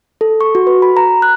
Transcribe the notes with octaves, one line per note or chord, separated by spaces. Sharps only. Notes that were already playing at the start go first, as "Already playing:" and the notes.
A4
C#6
F#4
B4
B5
A#5
F#6